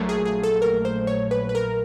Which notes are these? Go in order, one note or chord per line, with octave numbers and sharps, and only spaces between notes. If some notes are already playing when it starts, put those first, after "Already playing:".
Already playing: A#1 A#2 F#3 A3
G#4
G#4
A4
A#4
C5
C#5
B4
B4
A#4